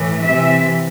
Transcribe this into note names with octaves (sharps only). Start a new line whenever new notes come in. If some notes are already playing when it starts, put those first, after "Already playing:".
Already playing: A2 E3
C3 E3 E5